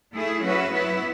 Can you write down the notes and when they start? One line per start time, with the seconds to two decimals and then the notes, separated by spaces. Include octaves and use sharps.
0.15 A3 E4 G#4
0.43 F#3 C#4 F#4 B4 E5
0.72 F#3 B3 E4 B4 E5